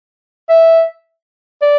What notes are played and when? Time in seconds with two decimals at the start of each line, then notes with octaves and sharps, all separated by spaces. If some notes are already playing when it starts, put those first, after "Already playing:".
0.49 E5
1.62 D5